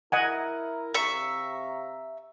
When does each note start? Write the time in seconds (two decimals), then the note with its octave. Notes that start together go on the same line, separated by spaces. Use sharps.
0.12 E4 A#4 D#5 F#5 G#5
0.94 C3 E5 F5 A#5 C#6